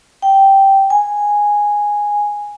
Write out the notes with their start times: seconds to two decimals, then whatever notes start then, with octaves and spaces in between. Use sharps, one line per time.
0.22 G5
0.90 G#5